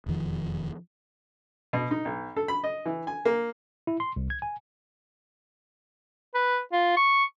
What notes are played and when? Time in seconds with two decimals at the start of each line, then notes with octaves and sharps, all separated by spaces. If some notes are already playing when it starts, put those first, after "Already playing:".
0.06 E1 F2 D#3 F3
1.73 B2
1.91 D#4
2.05 B1
2.36 A4
2.48 B5
2.64 D#5
2.86 E3
3.07 G#5
3.25 A#3
3.87 E4
4.00 C6
4.16 C2
4.30 G#6
4.42 G#5
6.35 B4
6.73 F4
6.97 C#6